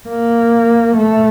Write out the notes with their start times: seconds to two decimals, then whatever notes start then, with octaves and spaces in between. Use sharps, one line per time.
0.08 A#3
0.97 A3